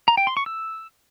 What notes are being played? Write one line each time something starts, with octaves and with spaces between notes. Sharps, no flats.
A#5
G5
C6
C#6
E6